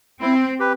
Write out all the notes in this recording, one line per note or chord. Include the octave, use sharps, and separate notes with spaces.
C4 E4
G4 B4